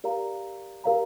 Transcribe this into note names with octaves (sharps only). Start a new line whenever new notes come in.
G4 A#4 D5 F5 A#5
G4 A#4 D5 F5 A#5